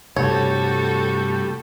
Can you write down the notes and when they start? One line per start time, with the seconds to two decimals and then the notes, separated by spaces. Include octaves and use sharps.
0.16 G2 C3 G3 A3 F#4 A4 C#5